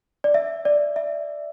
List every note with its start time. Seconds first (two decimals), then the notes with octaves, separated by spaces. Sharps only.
0.24 D5
0.34 E5
0.65 D5
0.96 E5